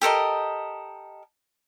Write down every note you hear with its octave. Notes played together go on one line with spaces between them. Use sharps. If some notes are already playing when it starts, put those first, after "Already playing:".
G4 A4 A#4 D#5